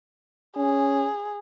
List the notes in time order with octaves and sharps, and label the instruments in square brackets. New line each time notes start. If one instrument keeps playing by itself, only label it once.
[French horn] C#4 [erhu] G#4